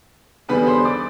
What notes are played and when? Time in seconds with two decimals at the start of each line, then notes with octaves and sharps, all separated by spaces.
0.49 E2 D3 G3 B3 B4 B5
0.67 C5 C6
0.85 D5 D6